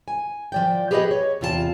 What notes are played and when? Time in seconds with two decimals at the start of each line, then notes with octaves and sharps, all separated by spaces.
0.08 G#5
0.52 F3 D5 G5
0.91 G4 G#4 B4 C#5 D#5 F#5
1.11 C#5
1.41 E2 C3 F4 A4 A5